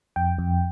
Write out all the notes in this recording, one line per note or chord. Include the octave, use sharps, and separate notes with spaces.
F2 G5
F2